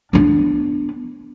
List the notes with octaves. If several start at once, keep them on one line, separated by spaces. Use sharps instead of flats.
B3 D4